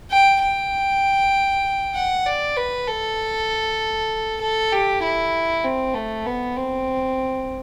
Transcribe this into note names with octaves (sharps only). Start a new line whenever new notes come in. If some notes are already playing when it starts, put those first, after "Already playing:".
G5
G5
F#5
D5
B4
A4
A4
G4
E4
C4
A3
B3
C4